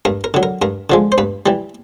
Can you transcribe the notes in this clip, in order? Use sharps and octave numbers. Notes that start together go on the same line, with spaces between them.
G2 A#4
A#4
D3 F#3
A#4
G2 A#4
D3 F3 G#3
C5
G2 B4
E3 G3